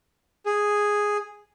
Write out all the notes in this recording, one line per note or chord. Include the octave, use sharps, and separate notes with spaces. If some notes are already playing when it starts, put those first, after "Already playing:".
G#4